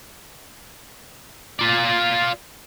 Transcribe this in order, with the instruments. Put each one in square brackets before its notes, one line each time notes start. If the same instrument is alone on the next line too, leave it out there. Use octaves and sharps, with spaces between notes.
[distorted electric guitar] F4 D5